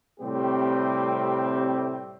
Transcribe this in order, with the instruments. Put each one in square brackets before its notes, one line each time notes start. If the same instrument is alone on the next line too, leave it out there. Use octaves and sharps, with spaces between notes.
[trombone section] A2 C3 G3 A3 C4 G4